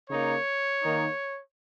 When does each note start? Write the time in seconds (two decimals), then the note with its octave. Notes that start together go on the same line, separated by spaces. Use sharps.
0.10 C#3 A#3 D#4 C#5
0.82 D#3 A#3 D#4